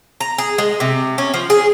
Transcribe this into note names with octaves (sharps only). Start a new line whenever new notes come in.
A#5
G#4
G#3
C3
C#4
F3
G#4